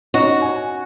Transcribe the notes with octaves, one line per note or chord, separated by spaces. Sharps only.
C#4 D#4 F#4 D#5
G#5